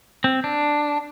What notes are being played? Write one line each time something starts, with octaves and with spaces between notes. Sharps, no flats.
C4
D4